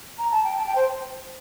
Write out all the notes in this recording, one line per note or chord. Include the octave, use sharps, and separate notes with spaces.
A#5
A5
G5
A5
G5
C5